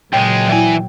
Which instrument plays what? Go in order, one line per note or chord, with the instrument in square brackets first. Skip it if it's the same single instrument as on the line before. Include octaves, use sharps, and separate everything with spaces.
[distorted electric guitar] C#2 G#3 [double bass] A#2 F#3 [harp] G5
[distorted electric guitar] E3 G#5 [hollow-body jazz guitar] E4 D5